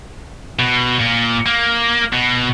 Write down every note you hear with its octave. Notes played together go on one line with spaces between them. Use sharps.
B2
A#2
A#3
B2